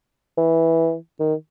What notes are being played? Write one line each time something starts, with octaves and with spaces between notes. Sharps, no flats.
E3
D#3